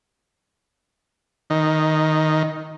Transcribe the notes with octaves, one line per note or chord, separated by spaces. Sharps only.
D#3